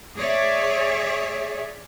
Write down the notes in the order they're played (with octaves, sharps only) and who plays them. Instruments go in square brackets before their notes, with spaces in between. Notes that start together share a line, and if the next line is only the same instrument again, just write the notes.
[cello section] G#4 C#5 D5 E5